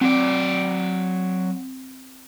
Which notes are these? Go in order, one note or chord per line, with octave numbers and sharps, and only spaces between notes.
F#3 C4 D5